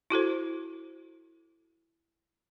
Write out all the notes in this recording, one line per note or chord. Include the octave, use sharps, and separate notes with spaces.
E4 F#4 A4 C5